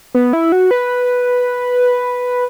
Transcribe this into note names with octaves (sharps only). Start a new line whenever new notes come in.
B3
E4
F#4
B4